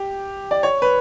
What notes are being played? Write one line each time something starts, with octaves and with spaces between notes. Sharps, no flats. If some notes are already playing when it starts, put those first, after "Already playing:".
Already playing: G4
D5
C#5
B4